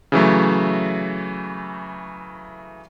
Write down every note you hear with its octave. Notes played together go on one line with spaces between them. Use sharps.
C#3 E3 F#3 A3